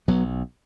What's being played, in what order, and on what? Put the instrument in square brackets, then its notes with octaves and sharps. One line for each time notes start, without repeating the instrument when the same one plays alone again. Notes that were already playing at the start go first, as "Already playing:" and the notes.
[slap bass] B1 B2 F#3 B3